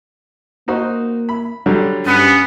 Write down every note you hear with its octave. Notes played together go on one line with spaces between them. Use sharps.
A#3 D#4 F#4 C5
B5
D3 F#3 G3
G2 B3 C#4